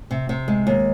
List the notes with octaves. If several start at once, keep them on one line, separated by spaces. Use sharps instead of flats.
C3
C3
G#3
D#2